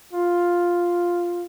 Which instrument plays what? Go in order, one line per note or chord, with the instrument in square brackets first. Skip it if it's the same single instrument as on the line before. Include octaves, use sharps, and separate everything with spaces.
[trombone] F4